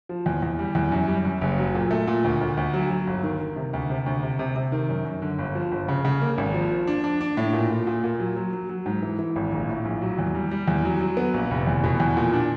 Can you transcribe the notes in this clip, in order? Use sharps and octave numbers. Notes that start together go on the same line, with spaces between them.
F3
E2
E2
G3
E2
F#2
G3
F#2
F#1
F#3
A#2
A3
A#2
D2
D2
D2
F#3
F#3
G1
D#3
D#3
C3
D2
C3
D2
C3
C3
C3
D#3
F#2
F#2
D3
G1
F3
G1
C#3
C#3
A#3
G#1
F3
F3
D4
D4
D4
A2
A#2
A#2
A#2
A#2
F#3
F#3
F#3
F#3
G#2
E3
E3
G#1
A#1
A2
A#1
F#3
E2
G3
G3
E2
F#3
F#3
B3
A#1
F1
E2
B2
E2
A#2
D4